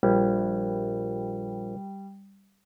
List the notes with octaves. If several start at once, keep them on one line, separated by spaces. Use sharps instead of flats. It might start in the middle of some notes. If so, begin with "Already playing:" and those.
A#1 G3